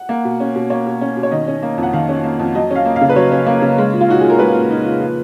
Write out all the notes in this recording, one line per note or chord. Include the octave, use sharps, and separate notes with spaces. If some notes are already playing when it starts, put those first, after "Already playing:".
Already playing: F#5
A#3
B2
C#4
B2
A#3 C#5
B2
C#4
B2
C#5
D#3 D#5
C#4
A#3
F2
F#5
D#3 F5
C#4
A#3
F2
F#3 D#5
C#4 F5
A#3
F5
C#3
B4
F#3 C#5
C#4
A#3
C#3
G#3
A#2
F4
D#4 F#4
A#2 G#4
A#4
G#3 B4
A#2
D#4
A#2
F3